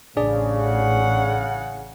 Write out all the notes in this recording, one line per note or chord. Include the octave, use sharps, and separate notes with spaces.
A1 C#3 D4 G#4 D5
F#5